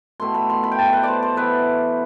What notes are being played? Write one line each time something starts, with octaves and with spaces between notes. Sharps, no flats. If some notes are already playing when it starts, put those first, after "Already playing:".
B2 A3 E4 C6
B5
C6
B5
G5
A5
B4
C5 D5
C5
E3 B3 E4 B4